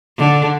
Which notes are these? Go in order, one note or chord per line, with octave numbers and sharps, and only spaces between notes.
D3